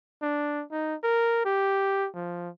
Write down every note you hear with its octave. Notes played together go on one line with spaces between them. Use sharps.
D4
D#4
A#4
G4
F3